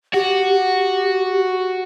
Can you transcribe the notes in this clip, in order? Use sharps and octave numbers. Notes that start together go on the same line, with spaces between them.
F#4 G4
G4